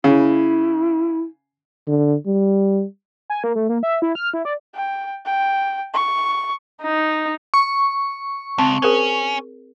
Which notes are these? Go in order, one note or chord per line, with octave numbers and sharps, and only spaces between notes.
C#3 E4
D3
G3
G#5
A#3
A3
A#3
E5
E4
F6
E4
D5
G5
G5
C#6
D#4
C#6
C#2 C4 A5
C#4 G#4 A#4 C5